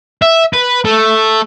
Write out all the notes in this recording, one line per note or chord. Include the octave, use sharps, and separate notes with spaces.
E5
B4
A3